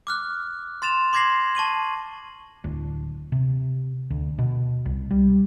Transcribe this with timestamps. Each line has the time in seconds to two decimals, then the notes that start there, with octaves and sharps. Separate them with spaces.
0.07 D6 F6 F#6
0.82 C6 A6 E7 F7
1.13 C6 D6 G#6 A#6 C7 F#7
1.55 A5 C#6 D#7 F#7
2.64 D1
3.32 C3
4.10 D2
4.38 B2
4.86 C2
5.11 G3